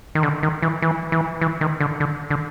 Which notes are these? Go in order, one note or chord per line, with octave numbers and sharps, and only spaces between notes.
D#3
D3
D#3
E3
E3
E3
E3
D#3
D3
D3
D3